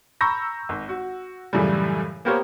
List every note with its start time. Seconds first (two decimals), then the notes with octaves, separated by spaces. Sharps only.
0.21 A#5 B5 C#6 E6 G6 A#6
0.69 G#1
0.89 F#4
1.53 F#2 A2 C#3 E3 G3
2.25 A#3 B3 G4 A#4 C5 C#5